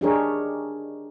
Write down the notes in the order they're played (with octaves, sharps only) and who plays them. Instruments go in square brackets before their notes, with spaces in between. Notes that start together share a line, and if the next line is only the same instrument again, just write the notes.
[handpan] D4 D#4 G4 G#4 A#4 C#5